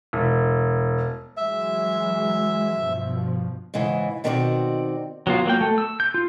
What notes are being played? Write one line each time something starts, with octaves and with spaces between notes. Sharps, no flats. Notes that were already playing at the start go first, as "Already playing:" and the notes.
E1
E3 F#3 G#3 E5
G2 B2 F3
G#2 C#3 E3
B2 D#3 C4 F#4 C#5 D5
F#3 B3 F4
F#3 A#3 G5
A3
E6
G6
F4